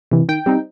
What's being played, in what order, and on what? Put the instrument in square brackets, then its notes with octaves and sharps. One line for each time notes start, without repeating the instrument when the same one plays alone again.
[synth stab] C3 E3
D#3 G5
G3 C4 D#4